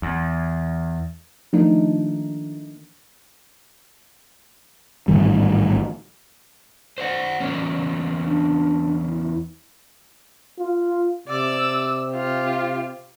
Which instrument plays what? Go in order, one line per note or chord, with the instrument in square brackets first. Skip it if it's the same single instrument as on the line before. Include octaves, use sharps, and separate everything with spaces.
[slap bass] E2
[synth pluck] D#3 F3 A3 A#3 D4 D#4
[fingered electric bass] A1 G#2 D#3 G3
[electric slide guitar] C5 D5 F#5
E2 A#3 C#4
[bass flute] D4
E4
[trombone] F4
[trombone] C3 [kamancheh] D5 E6
[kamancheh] F4 G4